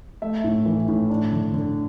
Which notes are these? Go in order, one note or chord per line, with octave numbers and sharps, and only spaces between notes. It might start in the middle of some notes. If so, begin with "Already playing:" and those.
A3 E5
A2
E3
A2
D4
D3
D3